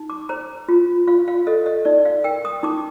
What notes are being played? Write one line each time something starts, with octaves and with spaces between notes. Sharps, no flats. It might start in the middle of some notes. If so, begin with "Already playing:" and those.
Already playing: D#4
D6
C5 A#5
F4
F4 F5
F5
A4 D#5
D#5
D#4 D5
F5
A#4 G5
D#6
D#4 D6